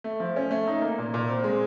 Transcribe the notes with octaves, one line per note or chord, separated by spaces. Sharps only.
A3
F3
C#4
A3
D#4
A#3
A#2
A#2
C4
G#3